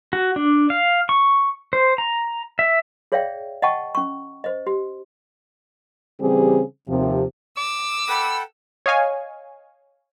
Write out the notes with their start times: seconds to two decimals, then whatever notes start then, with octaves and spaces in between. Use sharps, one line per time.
0.13 F#4
0.36 D4
0.70 F5
1.09 C#6
1.73 C5
1.98 A#5
2.59 E5
3.12 G#4 C#5 D5 E5 F5 G5
3.62 D#5 F#5 G5 A5 C#6
3.95 C#4 C#6
4.44 C5 D#5
4.67 G4
6.21 C#3 E3 G3 C4 G4 G#4
6.89 D#2 C3 F3
7.57 D6 E6
8.09 A4 F#5 G5 B5
8.86 C#5 D#5 F5 G#5